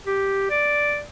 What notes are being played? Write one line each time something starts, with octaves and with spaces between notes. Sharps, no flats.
G4
D5